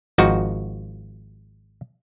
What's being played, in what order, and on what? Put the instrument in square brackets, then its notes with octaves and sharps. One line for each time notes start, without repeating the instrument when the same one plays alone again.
[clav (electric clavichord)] G#1 F3 D#4 F#4